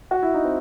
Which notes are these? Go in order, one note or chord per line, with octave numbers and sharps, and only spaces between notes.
F#4
E4
D#4
C4